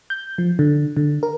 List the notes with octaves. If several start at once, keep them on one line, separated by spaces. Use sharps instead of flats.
G6
F3
D3
D3
A#4